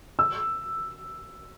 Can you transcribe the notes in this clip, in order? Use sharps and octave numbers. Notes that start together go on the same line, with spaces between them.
E6